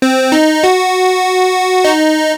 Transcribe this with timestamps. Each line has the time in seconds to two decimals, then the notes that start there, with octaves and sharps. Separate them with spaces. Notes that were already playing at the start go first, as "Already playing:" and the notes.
0.02 C4
0.32 D#4
0.64 F#4
1.84 D#4